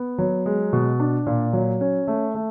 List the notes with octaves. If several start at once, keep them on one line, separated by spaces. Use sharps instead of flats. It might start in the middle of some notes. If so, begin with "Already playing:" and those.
Already playing: B3
F#3
G#3
B2
D4
A#2
F#3
C#4
A3
A3